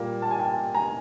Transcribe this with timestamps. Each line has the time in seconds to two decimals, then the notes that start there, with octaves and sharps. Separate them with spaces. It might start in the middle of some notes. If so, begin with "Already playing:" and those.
Already playing: A#2 G3 A#3
0.22 A5
0.31 G#5
0.39 G5 A5
0.75 G#5 A#5